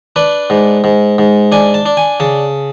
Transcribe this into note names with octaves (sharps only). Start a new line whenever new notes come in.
D4 B4
G#2
G#2
G#2
D4 G#5
A5
D4
G#5
C#3 A5